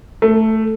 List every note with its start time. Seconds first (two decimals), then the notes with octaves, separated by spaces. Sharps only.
0.22 A3